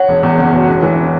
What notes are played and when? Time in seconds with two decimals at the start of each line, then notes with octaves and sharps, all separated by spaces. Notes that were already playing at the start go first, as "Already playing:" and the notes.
Already playing: C#5 F#5
0.09 E1
0.23 E2
0.38 F#1
0.53 B2
0.68 E1
0.83 E3